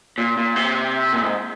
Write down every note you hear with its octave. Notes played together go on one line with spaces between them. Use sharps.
A#2
A#2
C3
A#2
G#2